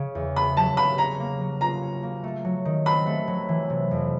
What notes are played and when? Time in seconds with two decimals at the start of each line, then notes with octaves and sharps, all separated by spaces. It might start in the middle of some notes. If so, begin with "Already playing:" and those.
Already playing: C#3
0.15 E2
0.36 B3 B5
0.57 F#3 A5
0.77 C#3 B5
0.98 C#4 A#5
1.20 A#3
1.41 F#3
1.61 F4 A#5
1.82 C#4
2.03 A#3
2.24 A3
2.45 F#3
2.65 D#3
2.86 C4 B5
3.06 A3
3.27 F#3
3.49 E3
3.70 C3
3.91 F2